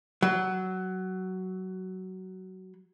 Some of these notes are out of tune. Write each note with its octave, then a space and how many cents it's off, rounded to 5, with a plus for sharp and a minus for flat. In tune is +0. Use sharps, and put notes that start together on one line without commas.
F#3 +15